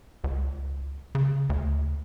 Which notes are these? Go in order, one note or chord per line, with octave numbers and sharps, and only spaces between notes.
C#2
C#3
D2